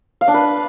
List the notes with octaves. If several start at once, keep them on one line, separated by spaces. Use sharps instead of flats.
F5
D4
B4